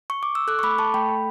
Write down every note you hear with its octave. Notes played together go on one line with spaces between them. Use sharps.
C#6
D6
E6
A4 D6 F#6
C#6
A3 B5 D6
A4 A5 C#6
A3 G5 B5
A4